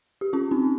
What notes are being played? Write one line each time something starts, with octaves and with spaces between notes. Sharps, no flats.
G4
C#4 F4
C4 D#4